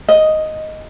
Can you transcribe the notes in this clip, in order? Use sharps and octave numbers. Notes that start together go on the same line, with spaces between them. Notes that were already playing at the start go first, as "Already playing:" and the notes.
D#5